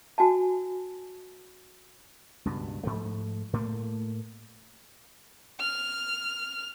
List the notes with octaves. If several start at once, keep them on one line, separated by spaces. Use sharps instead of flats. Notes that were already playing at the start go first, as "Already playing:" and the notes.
F#4 G#5 A5
C#2 G2 B2
G#2 F3 A3
A2 A3 A#3
F6